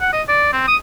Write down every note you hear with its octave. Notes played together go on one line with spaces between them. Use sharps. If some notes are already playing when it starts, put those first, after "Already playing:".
F#5
D#5
D5
C4
D#6